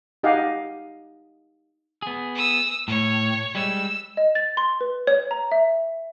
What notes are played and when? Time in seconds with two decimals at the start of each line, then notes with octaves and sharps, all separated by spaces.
0.23 D#4 G4 D#5 F5 F#5 G#5
2.02 B3 G#4
2.35 D#6 E6
2.88 A2 C#5
3.55 G3 G#3 E6
4.17 D#5
4.35 A6
4.57 C6
4.81 B4
5.07 C#5
5.31 A#5
5.52 E5